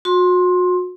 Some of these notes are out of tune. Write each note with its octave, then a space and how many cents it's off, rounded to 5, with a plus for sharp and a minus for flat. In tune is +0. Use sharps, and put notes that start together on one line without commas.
F#4 -35 C6 +15